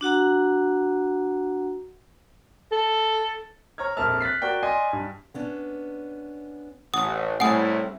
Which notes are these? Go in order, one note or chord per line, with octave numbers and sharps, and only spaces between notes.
D4 F#4 F#5 A#5
A4
C#5 A#5 F6 G#6
A#1 F2 A#4 E5 A5 F6
F#6 A6 B6 C7
F#4 A#4 D5 G5
D5 D#5 G#5 C6
G2
B3 C#4 D4
A1 F#5 D#6
C2 A2 G3 A3 C#4 F#5 G#5 D#6